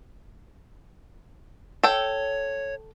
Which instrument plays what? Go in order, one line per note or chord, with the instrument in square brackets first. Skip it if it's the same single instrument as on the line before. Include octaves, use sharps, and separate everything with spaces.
[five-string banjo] A4 G5 [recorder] C#5